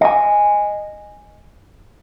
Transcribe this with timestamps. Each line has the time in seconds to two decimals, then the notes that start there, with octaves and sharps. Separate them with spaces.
0.01 D#5 G#5